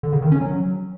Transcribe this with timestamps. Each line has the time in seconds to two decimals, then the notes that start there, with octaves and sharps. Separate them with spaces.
0.03 D3
0.13 C#3
0.22 D#3
0.32 C#4
0.41 F#3